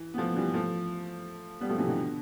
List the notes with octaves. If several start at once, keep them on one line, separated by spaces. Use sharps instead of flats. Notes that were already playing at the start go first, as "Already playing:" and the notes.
Already playing: E3
B3
F3 A3
E3 G3
F3 A3
G3 B3
F3 A3
C3 E3
B2 D3